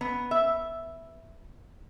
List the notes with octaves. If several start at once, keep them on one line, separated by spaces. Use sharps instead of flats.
B3
E5